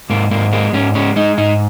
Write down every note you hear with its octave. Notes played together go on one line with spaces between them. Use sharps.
G#2 A#3
G#2 A#3
G#3 A#3
G#2 C#4
G#3 C#4
G#3 D#4
G#2 D#4